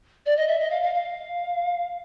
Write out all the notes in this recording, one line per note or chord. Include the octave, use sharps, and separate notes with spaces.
D5
D#5
E5
D#5
F5
F5
F5